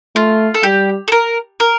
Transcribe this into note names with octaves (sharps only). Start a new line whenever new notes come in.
A3 F4
A4
G3 G4
A4
A#4
A#4